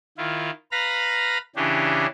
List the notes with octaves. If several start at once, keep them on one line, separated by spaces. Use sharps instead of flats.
D#3 E4 F4
B4 F5 A#5 B5 A#6
C#3 E3 C#4 D4 G4